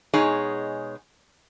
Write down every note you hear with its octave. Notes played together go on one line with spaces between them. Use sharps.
B2 G#3 D#4 G#4 C#5